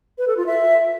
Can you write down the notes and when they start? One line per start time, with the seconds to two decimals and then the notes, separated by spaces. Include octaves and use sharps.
0.18 B4
0.28 A4
0.37 F4
0.46 E5